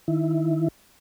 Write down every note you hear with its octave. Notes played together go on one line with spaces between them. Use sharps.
D#3 E4